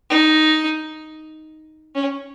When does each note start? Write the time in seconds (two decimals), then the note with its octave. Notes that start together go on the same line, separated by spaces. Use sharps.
0.10 D#4
1.95 C#4